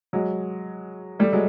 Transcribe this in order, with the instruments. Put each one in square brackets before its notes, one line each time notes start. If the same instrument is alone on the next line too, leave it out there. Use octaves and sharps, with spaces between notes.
[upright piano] F#3 G#3
G3 A3
F#3 G#3